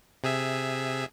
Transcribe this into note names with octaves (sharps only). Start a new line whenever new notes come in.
C3 G#4 E5